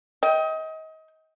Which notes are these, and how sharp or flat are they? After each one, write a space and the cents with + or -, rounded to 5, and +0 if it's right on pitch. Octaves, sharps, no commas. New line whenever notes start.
D#5 +30 G5 +0